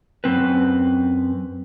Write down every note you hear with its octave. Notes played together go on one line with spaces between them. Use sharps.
F#2 E3 C4 B4